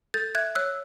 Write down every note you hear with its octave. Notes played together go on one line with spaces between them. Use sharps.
A4 G6 A6
E5 F#6 G#6
C#5 E6 F#6